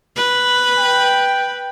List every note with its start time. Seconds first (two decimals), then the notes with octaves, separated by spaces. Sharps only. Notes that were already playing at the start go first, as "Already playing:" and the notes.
0.16 B4
0.79 G5